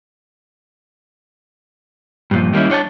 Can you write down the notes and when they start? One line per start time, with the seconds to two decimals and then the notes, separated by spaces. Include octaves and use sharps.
2.31 G2 A#2 F3
2.53 D#3 G3 A#3 B3 C#4 E4
2.70 D4 C#5 G5 A5